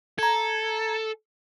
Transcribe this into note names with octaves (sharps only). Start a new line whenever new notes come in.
A4 A#5 G#6